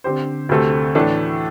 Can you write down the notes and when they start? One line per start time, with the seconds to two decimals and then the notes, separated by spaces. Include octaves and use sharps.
0.04 D3 C4 G4 C5
0.49 D2 C3 A3 C4 A4
0.95 A2 E3 A3 D4 A4